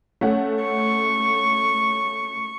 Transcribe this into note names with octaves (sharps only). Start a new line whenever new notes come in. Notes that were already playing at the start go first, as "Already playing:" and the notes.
A3 C#4 F#5
C#6